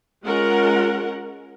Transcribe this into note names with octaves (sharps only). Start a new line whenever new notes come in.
G#3 C#4 F4 A#4 F#5